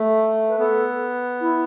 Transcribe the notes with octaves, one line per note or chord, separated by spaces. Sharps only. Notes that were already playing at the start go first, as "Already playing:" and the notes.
Already playing: A3
B4
B3 A4
E4